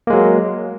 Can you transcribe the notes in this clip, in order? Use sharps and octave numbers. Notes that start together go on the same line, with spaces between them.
F#3 G#3 A#3